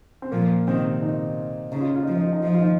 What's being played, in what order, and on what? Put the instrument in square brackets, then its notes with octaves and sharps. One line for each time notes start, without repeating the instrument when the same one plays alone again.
[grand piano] C4
[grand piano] A#2 A#3 [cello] F3
[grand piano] C3 C4 [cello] D#3
[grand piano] D#3 D#4
[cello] C#3 [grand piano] D#4
[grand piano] F4
D#4
F4
D#4
[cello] F3 [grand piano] F4
[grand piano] D#4
F4
D#4
F4
[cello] F3 [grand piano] D#4
[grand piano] F4
D#3 D#4